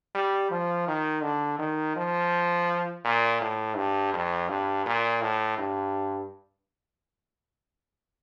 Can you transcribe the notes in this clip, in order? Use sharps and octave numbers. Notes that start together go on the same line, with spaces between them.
G3
F3
D#3
D3
D#3
F3
A#2
A2
G2
F2
G2
A#2
A2
G2